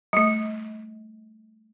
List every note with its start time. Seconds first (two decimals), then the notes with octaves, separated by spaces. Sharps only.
0.13 G3 A3